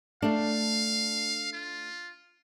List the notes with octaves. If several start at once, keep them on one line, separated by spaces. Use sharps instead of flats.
A3 D4 F5
F4